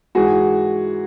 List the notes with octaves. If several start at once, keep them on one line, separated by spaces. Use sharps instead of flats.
G#2 E3 F#4 G#4